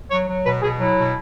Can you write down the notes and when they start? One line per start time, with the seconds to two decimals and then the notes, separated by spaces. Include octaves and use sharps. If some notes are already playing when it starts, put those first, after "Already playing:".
0.09 F#3 C#5
0.27 F#3
0.44 B2 B4
0.62 B2 G#4
0.78 F#3 E4
0.97 B2